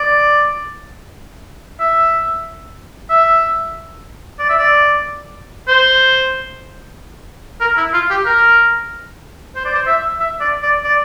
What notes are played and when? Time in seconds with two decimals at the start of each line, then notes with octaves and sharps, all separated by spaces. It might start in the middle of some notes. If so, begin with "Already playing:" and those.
Already playing: D5
1.80 E5
3.10 E5
4.39 D5
4.49 E5
4.59 D5
5.68 C5
7.61 A#4
7.77 E4
7.93 F4
8.10 G4
8.26 A#4
9.55 C5
9.65 D5
9.75 C5
9.87 E5
10.20 E5
10.40 D5
10.62 D5
10.84 D5